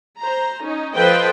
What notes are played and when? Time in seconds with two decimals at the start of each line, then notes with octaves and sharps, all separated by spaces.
0.19 C5 A#5
0.63 C#4 D#4
0.94 F3 A4 B4 C5 D#5 G5